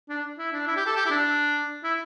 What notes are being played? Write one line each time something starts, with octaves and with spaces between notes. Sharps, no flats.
D4
E4
D4
E4
G4
A4
G4
E4
D4
E4